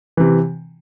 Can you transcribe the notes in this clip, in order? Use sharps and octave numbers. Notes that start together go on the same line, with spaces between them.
C3 E3